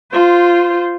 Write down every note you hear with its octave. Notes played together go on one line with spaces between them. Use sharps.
F4 C5